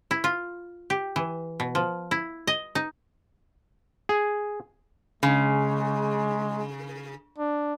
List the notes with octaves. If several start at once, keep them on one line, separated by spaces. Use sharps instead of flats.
E4
F4
G4
E3
B2
F3
E4
D#5
D#4
G#4
C#3 G#3
D4